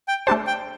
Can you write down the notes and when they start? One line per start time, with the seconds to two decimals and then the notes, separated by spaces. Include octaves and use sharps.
0.08 G5
0.27 A3 D4 G4 C5 A5
0.47 G5